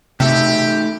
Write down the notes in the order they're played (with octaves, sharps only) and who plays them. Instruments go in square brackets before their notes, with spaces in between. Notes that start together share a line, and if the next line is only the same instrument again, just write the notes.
[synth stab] C3 [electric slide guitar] A3 D#4 F#4 [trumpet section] G4 [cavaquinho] A4 E5